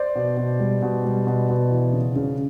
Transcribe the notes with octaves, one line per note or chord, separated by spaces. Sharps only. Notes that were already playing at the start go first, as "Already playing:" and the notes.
Already playing: C5 D5
B2
B2
G3
B2
G3
B2
B2
E3
C#3
C#3